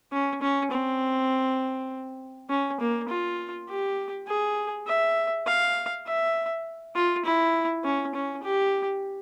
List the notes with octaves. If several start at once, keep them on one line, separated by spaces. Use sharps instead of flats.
C#4
C#4
C4
C#4
A#3
F4
G4
G#4
E5
F5
E5
F4
E4
C#4
C#4
G4